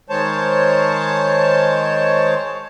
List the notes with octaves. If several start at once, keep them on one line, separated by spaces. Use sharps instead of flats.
D#3 G#3 C5 C#5 A5